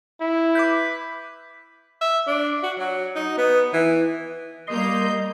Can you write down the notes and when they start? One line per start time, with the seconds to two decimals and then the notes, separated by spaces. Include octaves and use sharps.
0.20 E4
0.55 B4 D6 G6
2.01 E5
2.27 D4
2.63 F#4
2.78 F#3
3.16 D#4
3.38 B3
3.73 E3
4.67 G3 A#3 D#5 C6 G6